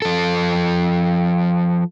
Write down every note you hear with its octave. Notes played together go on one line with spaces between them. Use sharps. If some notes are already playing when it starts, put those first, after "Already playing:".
F3 A4